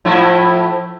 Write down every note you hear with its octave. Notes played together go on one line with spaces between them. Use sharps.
A2 F3 E4